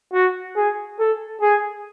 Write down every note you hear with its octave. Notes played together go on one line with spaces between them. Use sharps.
F#4
G#4
A4
G#4